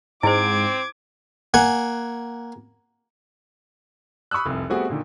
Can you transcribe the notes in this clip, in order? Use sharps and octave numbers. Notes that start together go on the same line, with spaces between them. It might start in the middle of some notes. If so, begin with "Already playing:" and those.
G#2 C4 E4 C5 D6 G#6 D7
A#3 F#5 G#5
B5 C#6 D#6 E6 F#6
F1 C2
G3 A3 B3 C4 F#4 G#4
A#2 D3 D#3